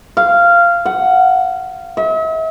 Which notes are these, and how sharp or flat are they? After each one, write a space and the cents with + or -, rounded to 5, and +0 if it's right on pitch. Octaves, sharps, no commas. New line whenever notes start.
F5 -15
F#5 +5
E5 -45